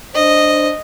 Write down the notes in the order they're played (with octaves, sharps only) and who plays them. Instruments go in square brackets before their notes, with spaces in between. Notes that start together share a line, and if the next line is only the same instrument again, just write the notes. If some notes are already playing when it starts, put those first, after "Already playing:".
[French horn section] D4 C5 [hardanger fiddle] D#5